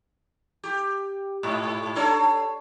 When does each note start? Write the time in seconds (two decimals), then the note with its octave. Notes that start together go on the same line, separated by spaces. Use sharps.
0.64 G4
1.43 G#2
1.96 D4 A4 C#5